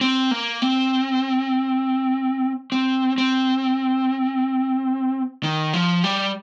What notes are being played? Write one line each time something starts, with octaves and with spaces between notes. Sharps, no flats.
C4
A#3
C4
C4
C4
D#3
F3
G3